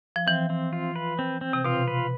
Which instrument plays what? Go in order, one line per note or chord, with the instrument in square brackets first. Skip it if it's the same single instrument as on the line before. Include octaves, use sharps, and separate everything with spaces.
[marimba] F3
[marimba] E3 [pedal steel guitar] C4
[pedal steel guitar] C4
F4
B4
C4
C4
[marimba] C3
[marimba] B2 [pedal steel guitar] F4
[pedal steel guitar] B4